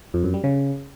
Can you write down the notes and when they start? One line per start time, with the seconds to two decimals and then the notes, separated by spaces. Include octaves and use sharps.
0.14 F2
0.24 F#2
0.34 G3
0.44 C#3